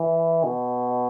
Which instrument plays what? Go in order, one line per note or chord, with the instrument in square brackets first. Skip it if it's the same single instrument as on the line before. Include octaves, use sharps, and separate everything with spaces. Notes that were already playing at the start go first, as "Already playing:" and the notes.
Already playing: [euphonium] E3
B2